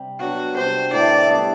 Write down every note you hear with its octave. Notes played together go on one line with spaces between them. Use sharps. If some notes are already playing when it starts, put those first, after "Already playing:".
Already playing: C3 G3 G4
F#3 B3 D4 F#4
C3 G3 D4 G4 C5
A2 E3 A3 E4 D5
G3 B3 D4